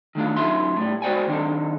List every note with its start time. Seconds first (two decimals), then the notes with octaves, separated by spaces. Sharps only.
0.15 D#3 A3 D4 F4
0.36 F#2 C#4 D#4 F4 E5 C6
0.76 A2 G3
1.02 G#3 F#4 C5 D5 G5 G#5
1.27 D#3 C4 D4 D#4 A4